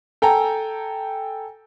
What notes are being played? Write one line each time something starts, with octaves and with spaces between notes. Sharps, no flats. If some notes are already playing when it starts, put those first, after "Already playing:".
A4 G5 G#5 A#5